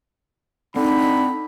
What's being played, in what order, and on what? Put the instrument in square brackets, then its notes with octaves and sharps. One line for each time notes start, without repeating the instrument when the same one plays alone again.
[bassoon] D3 [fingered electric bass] C4 [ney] D#4 [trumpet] B5